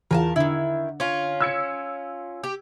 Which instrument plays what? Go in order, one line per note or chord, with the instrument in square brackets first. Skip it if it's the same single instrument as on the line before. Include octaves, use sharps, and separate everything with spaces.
[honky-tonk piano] E2 F4 [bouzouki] A#4 G#5 A5
[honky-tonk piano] D3 [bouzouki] D#3 E4
[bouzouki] C#4 F4
[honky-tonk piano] E6 G#6 C#7
[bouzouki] G4